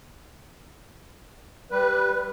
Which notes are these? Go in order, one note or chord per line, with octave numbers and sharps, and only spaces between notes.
G3 B4